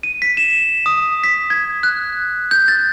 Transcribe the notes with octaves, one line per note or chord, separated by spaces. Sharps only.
D#7
B6
E7
D#6
B6
G#6
F#6
G6
A6